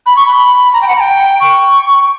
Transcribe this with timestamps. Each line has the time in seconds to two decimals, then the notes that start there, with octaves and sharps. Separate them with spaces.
0.06 B5
0.16 C#6
0.27 B5
0.73 A#5
0.82 G5
0.88 F#5
0.96 A#5
1.00 G5
1.40 C#6